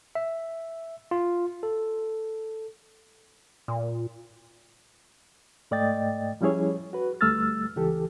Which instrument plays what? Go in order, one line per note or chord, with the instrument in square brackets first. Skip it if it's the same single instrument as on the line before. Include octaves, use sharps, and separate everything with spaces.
[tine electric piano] E5
F4
A4
[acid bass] A#2
[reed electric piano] G#2 A3 D5 D#5 G5 A6
F3 G3 C#4 E4 G#4 C#5
F#4 B4
D2 G3 A3 E6 F6 A6
C#2 E3 G4 A4